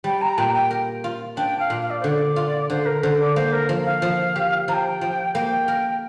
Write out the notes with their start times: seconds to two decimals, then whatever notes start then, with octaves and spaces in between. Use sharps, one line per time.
0.04 G3 G5
0.21 A#5
0.38 A#2 G5
0.54 G5
0.71 A#4
1.04 F4
1.37 D4 G5
1.59 F5
1.70 A#2
1.81 F5
1.90 D5
2.00 D3 C5
2.09 D5
2.36 F4
2.70 D3 C5
2.86 A#4
3.03 D3 C5
3.19 D5
3.36 A#3 C5
3.52 A#4
3.69 F3
3.85 F5
4.02 F3
4.36 G4
4.68 F3 A#5
4.73 G5
5.01 F3
5.34 A#3 G5
5.68 A#4